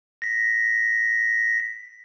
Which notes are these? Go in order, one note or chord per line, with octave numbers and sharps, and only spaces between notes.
A#6 B6